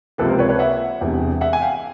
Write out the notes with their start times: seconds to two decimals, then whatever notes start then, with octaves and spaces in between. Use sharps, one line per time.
0.18 C#2 C3 F3 A#3 A4 B4
0.29 A#4 C5
0.39 B4 C#5
0.49 B4 C#5
0.59 E5 F#5
1.01 E1 E2 C3
1.41 E5 F#5
1.53 G#5
1.61 F5 G5